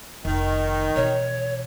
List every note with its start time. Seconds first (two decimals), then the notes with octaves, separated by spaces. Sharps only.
0.25 F1 D#3 F4
0.96 B2 E3 C#5